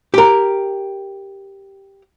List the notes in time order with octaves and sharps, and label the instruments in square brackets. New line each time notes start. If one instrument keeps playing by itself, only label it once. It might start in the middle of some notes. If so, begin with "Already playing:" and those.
[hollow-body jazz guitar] G4 A#4